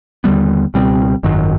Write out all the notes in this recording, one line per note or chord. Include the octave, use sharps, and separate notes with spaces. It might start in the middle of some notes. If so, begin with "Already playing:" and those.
D#2 D3 G3 B3
C#2 B2 G3 C4
G#1 F#2 D#3 F#3